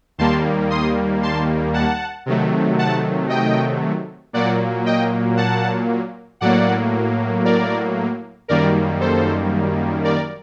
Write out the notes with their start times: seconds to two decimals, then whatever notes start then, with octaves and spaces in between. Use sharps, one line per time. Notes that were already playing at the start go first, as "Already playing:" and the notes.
0.18 D#2 D#3 G3 A#3 A5 C6
0.70 C6 D#6
1.22 A5 C6
1.74 F#5 A5
2.26 C3 D#3 F#3 A3
2.78 F#5 A5
3.29 D#5 G5
4.33 A#2 F#3 A#3 D5 F#5
4.86 D#5 G5
5.37 F#5 A5
6.41 A2 F#3 A#3 D5 F#5
7.45 A#4 D5
8.48 F#2 D#3 G3 A#3 A#4 D5
9.01 A4 C5
10.04 A#4 D5